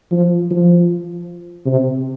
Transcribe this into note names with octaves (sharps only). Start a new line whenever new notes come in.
F3
F3
C3